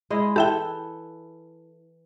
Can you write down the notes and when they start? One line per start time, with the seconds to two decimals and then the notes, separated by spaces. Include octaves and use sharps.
0.10 G#3 E4 D#5
0.36 E3 G4 A4 E5 G5